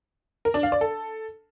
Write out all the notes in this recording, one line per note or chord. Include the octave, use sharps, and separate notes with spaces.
A#4
D4
F5
D5
A4